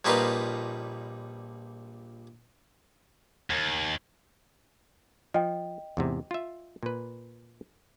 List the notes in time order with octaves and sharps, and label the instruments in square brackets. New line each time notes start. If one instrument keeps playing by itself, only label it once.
[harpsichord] A#1 G3 A#3 D#4 F4 B4
[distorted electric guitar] D#2
[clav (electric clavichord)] F3 [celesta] D#5 G5
[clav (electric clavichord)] E2 G#2 C3
F4 E5
A#2 B4